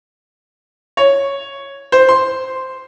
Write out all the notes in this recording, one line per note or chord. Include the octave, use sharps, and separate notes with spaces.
C#5
C5
C6